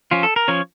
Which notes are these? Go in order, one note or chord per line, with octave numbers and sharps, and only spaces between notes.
F3 C#4 F4
A4
A#4
F3 C#4 C#5